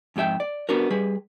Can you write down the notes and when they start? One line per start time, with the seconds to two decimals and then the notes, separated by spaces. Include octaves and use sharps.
0.16 F2 G#2 G4 E5 G5
0.40 D5
0.69 B3 D4 F#4 A#4
0.90 G3 G#4 B4